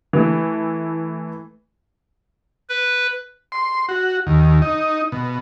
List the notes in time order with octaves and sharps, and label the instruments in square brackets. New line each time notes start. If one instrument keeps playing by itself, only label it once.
[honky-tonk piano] E3 A3
[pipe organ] B4
[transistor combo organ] C6
F#4
D#2
D#4
B2